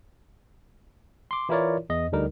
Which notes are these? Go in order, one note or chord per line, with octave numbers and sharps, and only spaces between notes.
C6 D6
E3 E4 F4 A#4 C#5 D5
E2 D#5
D2 D3 G3 D#4 A#4